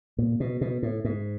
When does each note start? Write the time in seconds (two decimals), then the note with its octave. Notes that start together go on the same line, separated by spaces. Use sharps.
0.18 A#2
0.40 B2
0.61 B2
0.83 A2
1.05 G#2